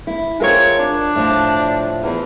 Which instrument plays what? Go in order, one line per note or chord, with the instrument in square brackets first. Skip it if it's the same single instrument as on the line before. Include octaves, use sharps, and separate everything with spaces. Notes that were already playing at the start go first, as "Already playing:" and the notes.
[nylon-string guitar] E4
[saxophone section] G#3 C4 C#5 [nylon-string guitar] F4 A#4
[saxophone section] D4
[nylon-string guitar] A2 F3
[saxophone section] E2